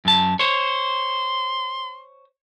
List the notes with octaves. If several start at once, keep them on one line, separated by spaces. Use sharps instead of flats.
F#2 A5
C5 C#5 C6